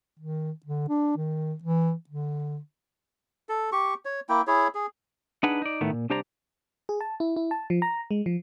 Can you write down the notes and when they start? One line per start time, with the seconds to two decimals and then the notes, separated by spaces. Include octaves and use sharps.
0.19 D#3
0.66 D3
0.89 D4
1.17 D#3
1.63 E3
2.09 D3
3.49 A4
3.72 G4 C#6
4.05 C#5
4.29 A#3 E4 G5
4.47 E4 G#4 C#5
4.75 G#4
5.43 D4 D#4 G#4 B4 F#5
5.62 D#4 D5
5.81 A2 D#3 A3 B3
5.92 A#2
6.10 C2 D4 G4 C5 D5 A#5
6.89 G#4
7.01 A5
7.20 E4
7.36 E4
7.51 A5
7.70 F3
7.82 A#5
8.11 G#3
8.26 F3